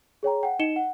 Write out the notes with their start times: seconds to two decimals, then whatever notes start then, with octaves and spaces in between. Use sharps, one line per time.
0.23 G#4 C#5 G5 A#5
0.43 F#5 G5
0.59 D#4 D#5 C#7 E7 G7
0.76 F#5